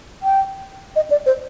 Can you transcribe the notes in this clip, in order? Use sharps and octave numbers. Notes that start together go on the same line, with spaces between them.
G5
D#5
D5
C5